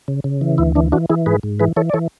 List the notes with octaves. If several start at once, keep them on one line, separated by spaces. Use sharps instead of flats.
C#3
C#3
E3
D2 E4
E3 D4
E3 D4 F#4
E3 E4 G#4
G#2 G#4 B4
G#2
E3 G#4 B4
E3 A4 C#5
D5
E3 A4 C#5